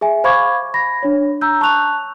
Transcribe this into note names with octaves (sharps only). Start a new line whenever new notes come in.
G#4 E5 G#5
C5 F5 B5 C#6 D6 G#6
B5 A#6
D4 C#5
A#5 E6 G6
A5 C#6 F#6 F7